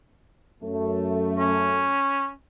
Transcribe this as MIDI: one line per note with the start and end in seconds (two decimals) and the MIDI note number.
0.63 1.97 42
0.63 1.97 57
1.39 2.31 61